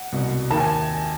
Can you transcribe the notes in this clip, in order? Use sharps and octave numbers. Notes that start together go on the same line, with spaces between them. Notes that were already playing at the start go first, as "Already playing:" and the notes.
Already playing: F#5
C2 B2
D#2 D#3 A5
G#5